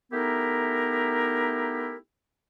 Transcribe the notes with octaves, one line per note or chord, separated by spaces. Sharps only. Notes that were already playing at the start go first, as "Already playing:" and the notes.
A3 B3 D#4 E4 G4 A#4